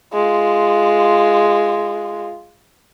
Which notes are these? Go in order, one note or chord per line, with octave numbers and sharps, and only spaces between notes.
G#3 F4